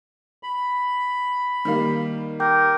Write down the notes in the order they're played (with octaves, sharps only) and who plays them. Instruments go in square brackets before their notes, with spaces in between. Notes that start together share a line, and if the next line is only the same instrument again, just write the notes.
[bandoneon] B5
[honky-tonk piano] D#3 G3 A#3
[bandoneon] A#4 [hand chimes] G5 D6 G6